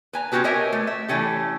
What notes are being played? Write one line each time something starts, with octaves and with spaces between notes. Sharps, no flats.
B4 G#5 A#5
C4 C#4 E4 F#4 G4 B4
G4 A#4 C#5 D#5 E5 G#5
A3
E5
E3 A3 C#4 G4